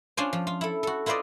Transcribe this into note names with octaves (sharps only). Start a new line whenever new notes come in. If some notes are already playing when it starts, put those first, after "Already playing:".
C#4 D4 F4 C5 D5 G#5
F3
F4
E4 A4
F#4 A4
E4 F4 B4 C5 D5 D#5